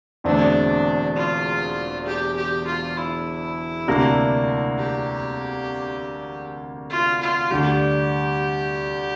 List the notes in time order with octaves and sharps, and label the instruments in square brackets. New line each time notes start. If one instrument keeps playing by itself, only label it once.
[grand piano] E1 E2 D3 A3 C4 [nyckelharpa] D4
[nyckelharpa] F4
G4
G4
F4
E4
[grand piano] D2 C3 G3 A#3 D4
[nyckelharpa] G4
F4
F4
[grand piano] D2 D3 G3 [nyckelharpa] G4